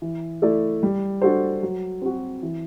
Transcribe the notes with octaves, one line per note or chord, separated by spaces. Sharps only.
E3
A3 E4 A4 D5
G3
D4 F#4 A4 C5
F#3
C4 F#4
E3